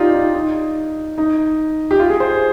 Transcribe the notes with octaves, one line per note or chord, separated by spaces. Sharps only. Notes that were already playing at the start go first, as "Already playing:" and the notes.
Already playing: D#4 F4 G4 D5
D#4
D#4
D#4
G4
F4
G#4
C5
G#4